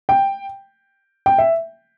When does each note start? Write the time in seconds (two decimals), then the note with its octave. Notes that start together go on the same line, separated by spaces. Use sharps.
0.09 G5
1.26 G5
1.38 E5